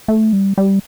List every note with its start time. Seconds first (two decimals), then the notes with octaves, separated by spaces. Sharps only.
0.08 A3
0.33 G3
0.58 G3